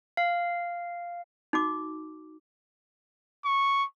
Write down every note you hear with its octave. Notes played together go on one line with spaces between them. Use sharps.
F5
D#4 F#4 D6
C#6